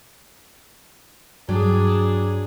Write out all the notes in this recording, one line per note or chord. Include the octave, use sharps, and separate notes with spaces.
G2 F#3 D4 G#4